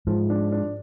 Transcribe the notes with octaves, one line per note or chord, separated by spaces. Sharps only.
G#2 F3
D4
D4